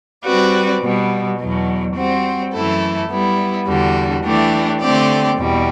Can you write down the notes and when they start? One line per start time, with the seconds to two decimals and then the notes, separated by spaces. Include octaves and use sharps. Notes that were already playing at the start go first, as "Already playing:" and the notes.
0.25 G3 C4 F#4 B4 D5
0.81 B2 G3 B3
1.38 E2 B2 F#3
1.95 G3 C4 F#4 C5
2.53 F#2 E3 A3 E4 A4
3.09 G3 B3 E4
3.67 E2 D3 G3 D4 F#4
4.23 E3 A3 D4 G4 D5
4.80 D3 A3 C4 G4 D5
5.37 E2 B2 G3